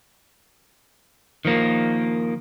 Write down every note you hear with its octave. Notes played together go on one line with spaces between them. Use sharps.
D#3 F3 A#3